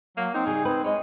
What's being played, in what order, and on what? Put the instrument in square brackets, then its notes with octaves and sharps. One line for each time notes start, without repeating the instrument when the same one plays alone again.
[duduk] F#3 [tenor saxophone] A#3
[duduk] C4 [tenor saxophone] D#4
[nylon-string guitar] C#3 G3 [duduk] G#4
[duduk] C4 [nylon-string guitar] B4
[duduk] G#3 [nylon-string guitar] C#5 D#5